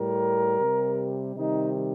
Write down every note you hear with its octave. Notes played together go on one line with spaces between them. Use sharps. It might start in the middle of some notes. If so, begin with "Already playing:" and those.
Already playing: A2 G3 A#4
C3 G3
C3 D#3 G3 D#4